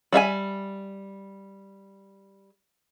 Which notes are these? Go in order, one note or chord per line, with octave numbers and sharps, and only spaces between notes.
G3 E5 F5 G#5